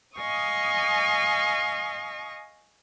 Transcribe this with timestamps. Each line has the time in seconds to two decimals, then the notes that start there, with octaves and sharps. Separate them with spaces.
0.18 D#5 F5 G#5 C#6 D#6